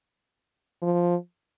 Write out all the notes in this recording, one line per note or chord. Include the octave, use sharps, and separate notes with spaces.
F3